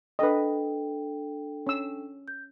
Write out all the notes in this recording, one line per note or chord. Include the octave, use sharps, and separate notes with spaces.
D4 A4 B4 D#5 G5
C#4 E6
G6